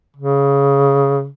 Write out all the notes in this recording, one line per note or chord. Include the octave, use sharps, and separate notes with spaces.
C#3